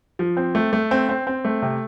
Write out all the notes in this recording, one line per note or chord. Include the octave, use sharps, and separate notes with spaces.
F3
C4
A3
A3
C4
C4
C4
A3
C3